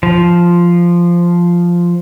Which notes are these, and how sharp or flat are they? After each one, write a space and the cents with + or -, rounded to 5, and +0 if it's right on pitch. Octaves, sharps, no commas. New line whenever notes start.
F3 -5